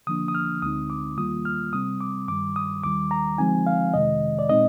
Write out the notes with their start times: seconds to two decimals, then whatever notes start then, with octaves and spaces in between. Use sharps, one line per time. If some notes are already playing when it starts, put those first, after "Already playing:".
0.07 D3 F3 A#3 D4 D#6
0.28 D#6
0.35 F6
0.62 D2 D3 G#3 C4 D#4 D#6
0.90 D6
1.17 D#2 D#3 G3 A#3 F4 D#6
1.45 F6
1.73 C3 G3 C4 D#6
2.01 D6
2.28 G2 D#3 G3 D6
2.56 D#6
2.84 D#2 D#3 G3 D6
3.11 A#5
3.38 D3 F3 G#3 C4 D#4 G#5
3.67 F5
3.94 F2 C3 D#3 G#3 D#5
4.39 D5
4.49 A#2 G#3 C4 D#4 D#5